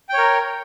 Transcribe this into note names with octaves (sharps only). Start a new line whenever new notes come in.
A#4 C#5 G5